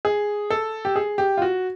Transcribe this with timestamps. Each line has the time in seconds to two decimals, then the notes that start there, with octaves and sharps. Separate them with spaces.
0.05 G#4
0.50 A4
0.85 G4
0.96 G#4
1.18 G4
1.37 F4
1.42 F#4